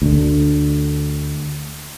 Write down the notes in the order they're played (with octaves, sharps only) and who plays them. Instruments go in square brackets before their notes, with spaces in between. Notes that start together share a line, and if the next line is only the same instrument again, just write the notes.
[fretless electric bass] D2 D3